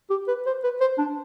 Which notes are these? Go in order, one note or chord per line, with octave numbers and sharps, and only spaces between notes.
G4
B4
C5
B4
C5
D4